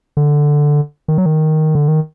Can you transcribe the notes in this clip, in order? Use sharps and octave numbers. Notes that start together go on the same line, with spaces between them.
D3
D#3
F#3
D#3
D3
D#3